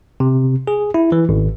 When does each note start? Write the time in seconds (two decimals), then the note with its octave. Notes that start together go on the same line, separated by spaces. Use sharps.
0.20 C3
0.67 G#4
0.94 E4
1.12 E3
1.29 G#1